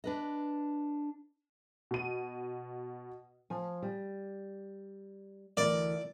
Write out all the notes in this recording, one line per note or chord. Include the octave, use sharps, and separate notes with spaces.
D4 B4 D#5
B2 D#7
F3 G#5
G3
D2 E3 A#4 D5